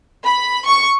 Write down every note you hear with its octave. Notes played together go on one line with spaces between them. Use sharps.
B5
C#6